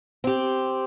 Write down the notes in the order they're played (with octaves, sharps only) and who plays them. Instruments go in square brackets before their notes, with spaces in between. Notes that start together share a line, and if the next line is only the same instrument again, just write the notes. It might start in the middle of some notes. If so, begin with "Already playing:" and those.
[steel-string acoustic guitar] C4 G4